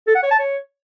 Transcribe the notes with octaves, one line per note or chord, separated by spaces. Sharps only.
A4
F#5
C#5
A5
C#5